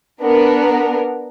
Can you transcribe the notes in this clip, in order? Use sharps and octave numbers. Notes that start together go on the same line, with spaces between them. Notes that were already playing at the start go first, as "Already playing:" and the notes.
B3 D4 A#4